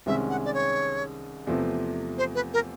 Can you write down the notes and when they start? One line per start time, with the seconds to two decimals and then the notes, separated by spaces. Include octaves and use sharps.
0.06 C2 C3 D#3 G#3 C#4 E5
0.30 F#5
0.45 D5
0.54 C#5
1.47 E2 C3 F3 A3
2.18 C5
2.35 B4
2.54 A#4